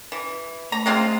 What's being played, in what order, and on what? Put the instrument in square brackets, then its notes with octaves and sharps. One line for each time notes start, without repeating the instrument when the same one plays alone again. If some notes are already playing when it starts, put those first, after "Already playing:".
[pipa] E3
[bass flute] A3 [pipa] A#5
[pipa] G#3 C4 F4